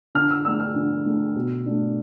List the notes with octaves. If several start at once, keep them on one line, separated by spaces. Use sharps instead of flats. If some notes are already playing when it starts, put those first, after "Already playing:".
D3 F6
E6
A3 D4 E6
F6
D3
A3 D4
B2
A3 D4